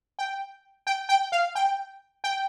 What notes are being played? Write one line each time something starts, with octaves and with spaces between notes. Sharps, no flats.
G5
G5
G5
F5
G5
G5